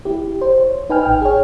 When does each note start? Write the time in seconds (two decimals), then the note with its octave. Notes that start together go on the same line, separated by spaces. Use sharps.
0.05 E4 G4
0.41 C5
0.61 C#5
0.90 D#4 B4 G5 G#5 F6
1.03 A1 G5 F6
1.22 G#4 C#5